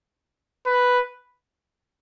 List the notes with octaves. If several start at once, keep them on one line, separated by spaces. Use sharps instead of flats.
B4